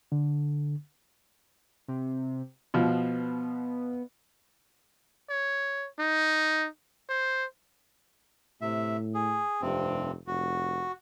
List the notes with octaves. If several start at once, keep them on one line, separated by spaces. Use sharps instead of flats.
D3
C3
B2 F3 B3
C#5
D#4
C5
A2 C3 E5
G#4
F1 G2 C3 C4
F1 F#4